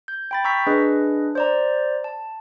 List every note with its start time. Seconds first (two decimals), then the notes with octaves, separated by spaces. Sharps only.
0.08 G6
0.31 G5 B5 A6
0.44 A#5 C#6 E6 G6 B6
0.67 D4 G#4 B4 D#5
1.35 C5 D5 A#5
2.04 A5